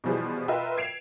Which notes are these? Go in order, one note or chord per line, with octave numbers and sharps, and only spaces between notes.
B2 E3 F3 G3 G#4
F4 A#4 B4 D#5 E5 G5
G#6 C7 D7 E7 F7